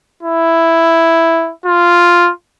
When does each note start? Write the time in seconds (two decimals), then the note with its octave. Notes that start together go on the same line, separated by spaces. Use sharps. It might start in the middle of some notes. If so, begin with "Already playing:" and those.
0.23 E4
1.66 F4